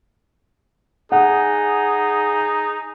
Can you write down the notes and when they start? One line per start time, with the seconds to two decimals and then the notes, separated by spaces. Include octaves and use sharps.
1.12 D#4 G#4 F#5